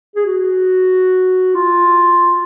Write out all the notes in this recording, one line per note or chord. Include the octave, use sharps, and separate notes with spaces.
G#4
F#4
F4